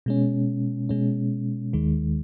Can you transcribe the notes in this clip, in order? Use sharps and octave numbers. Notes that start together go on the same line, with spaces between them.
B2 G#3 C#4
B2 G#3 C#4
D#2 D#3 G#3